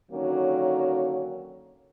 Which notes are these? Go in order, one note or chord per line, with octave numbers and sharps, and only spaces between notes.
D3 D#3 F#3 A#3 C#4